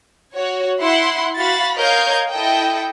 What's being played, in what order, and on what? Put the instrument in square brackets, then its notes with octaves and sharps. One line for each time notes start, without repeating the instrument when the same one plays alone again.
[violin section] F#4 C#5
E4 F#5 C6
F#4 F5 B5 A6
A#4 C#5 D#5 F5 G6 G#6
E4 A4 D#5 G5